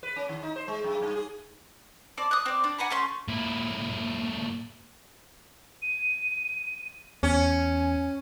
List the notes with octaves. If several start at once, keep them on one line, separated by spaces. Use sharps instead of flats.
B4
C#4
D#3
D#4
C5
G#3
F#2
G2
G#4
C4 D5 A5 D6
D#6 F#6
C4 D5
D4
F#5 G#5 A#5 B5
A3 C#4 C6
A#2 E4
D#7
E2 C#4 G#5